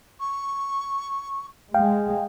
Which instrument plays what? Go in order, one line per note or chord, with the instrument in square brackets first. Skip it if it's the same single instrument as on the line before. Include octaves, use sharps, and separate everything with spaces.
[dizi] C#6
[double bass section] G#3 [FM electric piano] F5 G5